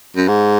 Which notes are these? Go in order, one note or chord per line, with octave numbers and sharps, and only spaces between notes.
F#2
G#2